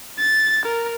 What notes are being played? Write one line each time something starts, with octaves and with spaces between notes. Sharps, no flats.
A6
A#4